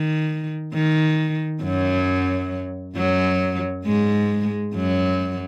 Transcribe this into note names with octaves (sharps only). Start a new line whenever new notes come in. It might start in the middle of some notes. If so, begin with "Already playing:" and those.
Already playing: D#3
D#3
F#2 F#3
F#2 F#3
G#2 G#3
F#2 F#3